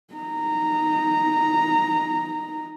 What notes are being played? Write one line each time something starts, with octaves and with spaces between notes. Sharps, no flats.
D#4 A#5